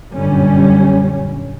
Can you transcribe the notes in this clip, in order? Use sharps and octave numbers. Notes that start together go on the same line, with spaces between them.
G1 F#2 A#2 D3 G3 C#4